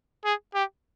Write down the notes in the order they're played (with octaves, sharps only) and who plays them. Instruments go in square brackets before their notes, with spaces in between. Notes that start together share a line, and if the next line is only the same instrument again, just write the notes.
[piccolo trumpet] G#4
G4